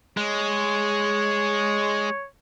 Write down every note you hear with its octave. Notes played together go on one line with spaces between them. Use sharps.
G#3 C#5